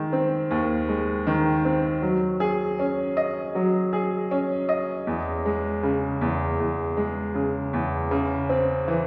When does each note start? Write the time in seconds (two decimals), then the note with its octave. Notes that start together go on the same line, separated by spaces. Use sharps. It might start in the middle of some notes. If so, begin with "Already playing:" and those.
Already playing: D#3 G#3
0.13 C4
0.51 D#2
0.88 G#3
1.27 D#3
1.65 C4
2.02 F#3
2.40 G#4
2.79 C#4
3.17 D#5
3.55 F#3
3.93 G#4
4.31 C#4
4.69 D#5
5.07 E2
5.45 G#3
5.83 C#3
6.21 E2
6.60 E2
6.97 G#3
7.35 C#3
7.73 E2
8.11 C#3
8.49 C4
8.88 E3